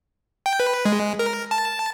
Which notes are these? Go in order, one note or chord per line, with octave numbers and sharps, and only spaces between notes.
G5
B4
G#3
A#4
A5